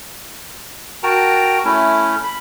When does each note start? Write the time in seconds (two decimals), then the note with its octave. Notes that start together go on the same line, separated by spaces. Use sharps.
1.03 F#4 A#4 G5 A5 A#5
1.65 A3 C#4 E4
2.23 B5